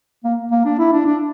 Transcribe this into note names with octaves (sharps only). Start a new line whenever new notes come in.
A#3
A#3
D4
E4
D4
D4